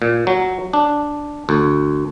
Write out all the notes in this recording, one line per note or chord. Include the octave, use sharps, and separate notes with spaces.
A#2
F#3
D4
D2